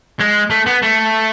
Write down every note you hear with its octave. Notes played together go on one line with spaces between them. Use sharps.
G#3
A3
B3
A3